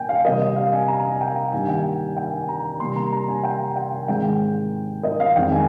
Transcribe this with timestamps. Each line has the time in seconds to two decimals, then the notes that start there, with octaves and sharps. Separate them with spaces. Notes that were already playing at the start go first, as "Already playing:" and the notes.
Already playing: A#2 G5 G#5
0.09 F5
0.25 C3 G3 C4 D#5
0.56 F5
0.72 G#5
0.88 A#5
1.05 G#5
1.21 G5
1.52 G2 D#3 G3 A#3 G#5
1.69 G5
2.17 G5
2.33 G#5
2.49 A#5
2.64 A#5
2.80 C3 G3 A#3 C6
2.96 A#5
3.13 A#5
3.28 G#5
3.44 G5
3.76 G5
3.92 G#5
4.08 G#2 D#3 G#3 C4 G5
5.03 D#5
5.20 F5
5.36 F2 D#3 G#3 C4 G5
5.52 G#5